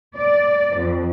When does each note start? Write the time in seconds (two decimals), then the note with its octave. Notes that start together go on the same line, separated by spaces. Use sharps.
0.17 D5
0.77 F2